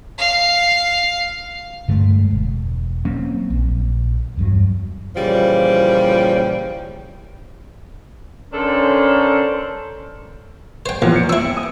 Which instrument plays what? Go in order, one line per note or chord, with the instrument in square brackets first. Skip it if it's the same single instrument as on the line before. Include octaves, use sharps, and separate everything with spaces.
[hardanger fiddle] F5
[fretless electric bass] G2 D3 G#3 A3
E1
F#3 A#3 C4 C#4
A#1
E2 G2 F#3
[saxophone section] A#2 C#3 E3 F3 G3
[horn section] D3 C#4 D4 A4 A#4 C5
[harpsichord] C5 G5
[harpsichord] A#1 [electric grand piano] E2 F4
[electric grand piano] C#7 D7
[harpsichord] C4 E4 [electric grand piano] E6
[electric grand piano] D#6